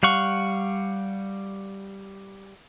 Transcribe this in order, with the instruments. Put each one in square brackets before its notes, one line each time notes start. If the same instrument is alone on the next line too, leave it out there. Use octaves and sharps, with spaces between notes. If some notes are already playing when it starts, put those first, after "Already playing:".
[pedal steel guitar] G3 F5 F#5 C#6